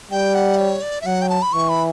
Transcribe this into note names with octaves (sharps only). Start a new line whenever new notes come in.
G3 G5
F#5
C#5
D5
E5
F#3 F#5
G5
A5
B5
E3 C#6
B5